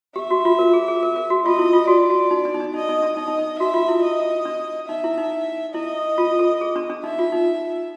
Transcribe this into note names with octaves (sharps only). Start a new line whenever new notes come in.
G4 E5
F#4
F4
A#4
G#4
G#4
A#4
A#4
F#4
F4 D#5
E4
F4
F#4 D5
F#4
D#4
D4
D#4
D4
D#4 D#5
D#4
D4
D#4 D#5
D#4
D#4
F#4 E5
F4
E4
D#5
D4
D#4 E5
E4
D#4
E4 D#5
F4
A4
G#4
D4
D4
D#4 E5
F4
D#4